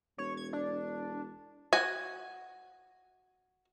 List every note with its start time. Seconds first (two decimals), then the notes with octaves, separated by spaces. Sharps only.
0.18 E1 C#5
0.37 G#6
0.53 D4
1.73 F#4 G#5